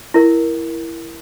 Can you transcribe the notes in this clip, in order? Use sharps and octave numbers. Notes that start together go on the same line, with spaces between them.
E4 A#4